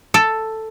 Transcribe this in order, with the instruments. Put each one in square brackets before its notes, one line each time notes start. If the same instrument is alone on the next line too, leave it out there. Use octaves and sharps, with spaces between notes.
[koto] A4